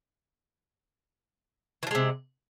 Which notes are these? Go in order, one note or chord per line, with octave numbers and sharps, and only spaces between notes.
C3 E3 F3 G#3